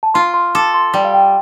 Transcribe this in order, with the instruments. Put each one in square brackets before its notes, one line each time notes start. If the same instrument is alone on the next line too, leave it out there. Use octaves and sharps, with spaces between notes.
[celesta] A5
[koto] F4 [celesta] C6
[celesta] C6
[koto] A4 [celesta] D6
[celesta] C6
[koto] G3 [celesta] G5
[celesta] F5
G5